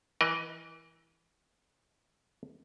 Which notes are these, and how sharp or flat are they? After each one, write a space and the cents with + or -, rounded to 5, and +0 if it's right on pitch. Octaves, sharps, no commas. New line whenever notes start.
E3 +0 A#4 +40 D#5 +0